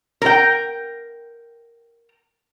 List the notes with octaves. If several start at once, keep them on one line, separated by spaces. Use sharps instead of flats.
A#4 G5